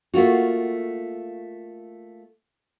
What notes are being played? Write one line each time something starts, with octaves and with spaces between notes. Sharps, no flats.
A3 A#3 F4 F#4